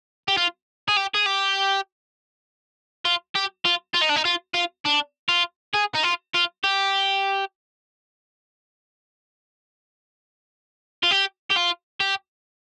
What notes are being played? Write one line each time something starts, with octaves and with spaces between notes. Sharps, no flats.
G4
F4
G#4
G4
G#4
G4
F4
G4
F4
F4
D#4
D4
D#4
F4
F4
D4
F4
G#4
D#4
F4
F4
G4
F4
G4
G4
F4
G4